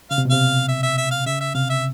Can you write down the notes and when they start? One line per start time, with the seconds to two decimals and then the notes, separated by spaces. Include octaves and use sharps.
0.11 C#3 F5
0.18 C3
0.25 B2
0.30 C3 F5
0.68 E5
0.83 E5
0.98 E5
1.11 F5
1.26 C#3 E5
1.41 E5
1.55 C3 F5
1.70 E5